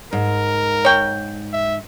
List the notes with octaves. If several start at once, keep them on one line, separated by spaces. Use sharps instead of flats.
G#2 A#4
C#5 G5
E5